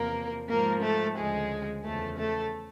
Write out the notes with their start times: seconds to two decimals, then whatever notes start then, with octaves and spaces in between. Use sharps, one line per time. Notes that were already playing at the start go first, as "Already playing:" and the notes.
Already playing: E2 C3 F3 A#3 A#4
0.48 G#2 F3 A#3 A#4
0.82 A3 A4
1.16 D2 C#3 F3 G#3 G#4
1.84 E2 C#3 F3 A3 A4
2.18 A3 A4